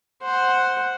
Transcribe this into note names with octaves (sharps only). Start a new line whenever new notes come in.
C5 F#5